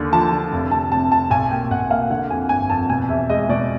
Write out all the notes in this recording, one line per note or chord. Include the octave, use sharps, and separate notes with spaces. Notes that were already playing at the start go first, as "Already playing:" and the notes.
Already playing: D#2 D3 A#3
F3 A5
D3
F1
F1 A5
F1 A5
F1 A5
B1 G#5
A#3 G5
B1 F#5
A#3 F5
D3 F#5
F2 G#5
G1 G#5
F2 A5
B2 G#5
E2 E5
G#3 D#5
B2 D5